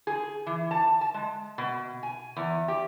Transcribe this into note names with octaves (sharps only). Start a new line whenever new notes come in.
G#4
E3
A5
A5
G#3
B2
G#5
E2
G4